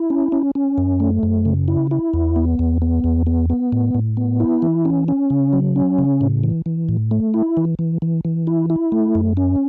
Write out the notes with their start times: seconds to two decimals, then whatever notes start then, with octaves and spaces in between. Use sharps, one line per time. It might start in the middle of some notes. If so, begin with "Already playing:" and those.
Already playing: E4
0.10 C#4
0.32 C#4
0.55 C#4
0.78 F#2
1.00 A3
1.23 F#2
1.45 C#3
1.68 E4
1.91 E4
2.14 E2
2.36 B3
2.59 E2
2.82 B3
3.04 E2
3.27 B3
3.50 B3
3.72 A2
3.95 A2
4.17 B3
4.40 E4
4.62 E3
4.85 C#4
5.08 C#4
5.30 C#3
5.53 F#3
5.76 C#4
5.98 C#3
6.21 A2
6.44 E3
6.66 E3
6.89 A2
7.11 A3
7.34 E4
7.57 E3
7.79 E3
8.02 E3
8.25 E3
8.47 E4
8.70 E4
8.92 A3
9.15 F#2
9.37 C#4